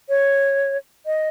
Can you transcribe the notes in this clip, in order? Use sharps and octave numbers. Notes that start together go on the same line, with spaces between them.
C#5
D#5